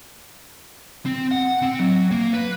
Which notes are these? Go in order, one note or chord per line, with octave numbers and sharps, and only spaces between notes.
C4
F#5
C4
F#3
A#3
B4